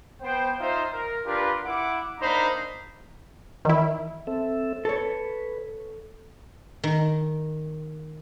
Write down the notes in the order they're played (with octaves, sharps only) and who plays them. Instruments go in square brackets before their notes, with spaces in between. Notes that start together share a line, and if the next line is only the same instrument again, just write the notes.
[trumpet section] B3 C5 G5
D#4 F4 C5 E5 F5 C6
A#4
D4 F4 G4 A#4 B4
E4 F#5 D6
A#3 D4 D#4 C5 A#5 B5
[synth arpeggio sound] D#3 E4 [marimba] E3
[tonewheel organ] C4 A4 E5
[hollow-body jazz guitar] A4 C#5 [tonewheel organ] B4
[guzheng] D#3